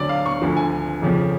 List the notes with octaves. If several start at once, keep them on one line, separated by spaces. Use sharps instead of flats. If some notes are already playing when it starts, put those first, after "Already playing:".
Already playing: D2 D3 F#3 D5
F5
C#6
D2 D3 F3
G#5
F2 C#3 F3